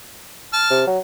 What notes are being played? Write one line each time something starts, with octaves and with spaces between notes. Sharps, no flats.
A5 F6
C3
F#3